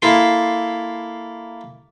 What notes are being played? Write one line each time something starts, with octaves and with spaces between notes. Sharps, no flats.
A#3 E4 A4 C6